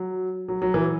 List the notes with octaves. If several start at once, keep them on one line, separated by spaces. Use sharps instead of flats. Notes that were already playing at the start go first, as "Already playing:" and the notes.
Already playing: F#3
F#3
F#3
E3